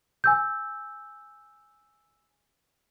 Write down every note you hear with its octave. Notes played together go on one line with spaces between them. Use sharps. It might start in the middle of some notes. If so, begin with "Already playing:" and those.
G#5 E6 G6